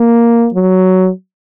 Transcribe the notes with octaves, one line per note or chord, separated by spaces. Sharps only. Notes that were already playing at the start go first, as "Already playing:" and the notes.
Already playing: A#3
F#3